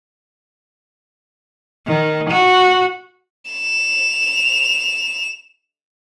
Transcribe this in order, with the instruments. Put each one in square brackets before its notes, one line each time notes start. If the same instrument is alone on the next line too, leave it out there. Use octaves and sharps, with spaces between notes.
[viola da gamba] D#3
F#4
[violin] E7 F7